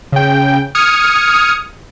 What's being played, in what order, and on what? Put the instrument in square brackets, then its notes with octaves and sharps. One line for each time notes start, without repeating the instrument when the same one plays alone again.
[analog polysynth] C#3 G5
D#6 F6 G#6 C#7